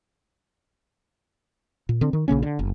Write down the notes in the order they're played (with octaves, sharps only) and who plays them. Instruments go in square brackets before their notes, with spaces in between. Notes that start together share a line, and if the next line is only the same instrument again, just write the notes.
[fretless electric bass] A#2
D3 C4
D#3
A#1 C#3 A#3 C#4
D3
F#1